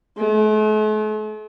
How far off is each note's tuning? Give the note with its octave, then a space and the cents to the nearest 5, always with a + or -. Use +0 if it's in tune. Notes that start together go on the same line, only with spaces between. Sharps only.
A3 -45